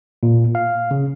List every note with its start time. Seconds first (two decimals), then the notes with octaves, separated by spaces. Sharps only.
0.23 A#2
0.55 F5
0.91 C#3